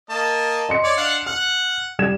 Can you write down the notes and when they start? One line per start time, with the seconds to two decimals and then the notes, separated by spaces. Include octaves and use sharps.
0.10 A#3 D#5 A5
0.69 D#5 C6 C#7
0.84 C#5 D5
0.97 D4 F5 F#5
1.26 F#5 F6
1.99 G3 G#6 E7